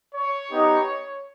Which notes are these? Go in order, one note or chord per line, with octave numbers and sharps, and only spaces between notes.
C#5
B3 D#4 G4